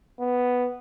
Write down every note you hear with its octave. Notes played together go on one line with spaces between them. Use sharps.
B3